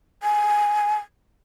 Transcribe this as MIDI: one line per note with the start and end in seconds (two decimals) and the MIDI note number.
0.23 0.96 80